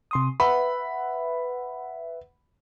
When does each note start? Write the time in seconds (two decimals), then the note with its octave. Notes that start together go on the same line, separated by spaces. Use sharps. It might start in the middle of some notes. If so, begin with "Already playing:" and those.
0.11 C3 C6 D#6
0.40 B4 E5 F#5 B5